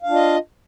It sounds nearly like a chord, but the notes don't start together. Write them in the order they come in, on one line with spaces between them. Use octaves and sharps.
F5 D4 F4 D#5